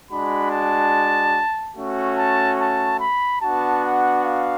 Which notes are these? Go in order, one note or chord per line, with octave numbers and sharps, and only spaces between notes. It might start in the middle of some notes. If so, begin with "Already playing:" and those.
G#3 D4 F#4 B5
A5
A3 C#4 F#4
A5
A5
B5
B3 D4 F#4 A5
F#5
F5